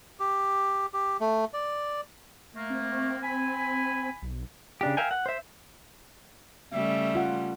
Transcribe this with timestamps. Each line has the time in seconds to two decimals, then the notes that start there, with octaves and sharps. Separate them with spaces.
0.20 G4
0.94 G4
1.20 A3
1.53 D5
2.56 A3 A#3
2.70 C4
3.24 G#5 B5
4.22 B1
4.81 C#3 D4 G4
4.97 A#4 E5 F5 G5 G#5
5.11 F#5
5.26 C5 E5
6.73 C#3 G3 A3 E5
7.15 F4 F#5